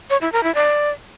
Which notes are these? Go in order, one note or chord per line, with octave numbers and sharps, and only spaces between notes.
C#5
E4
A#4
E4
D5